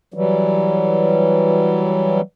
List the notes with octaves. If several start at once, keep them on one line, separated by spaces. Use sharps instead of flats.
E3 F#3 G3